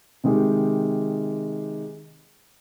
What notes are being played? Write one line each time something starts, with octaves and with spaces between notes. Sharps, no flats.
C3 D#3 G#3 G4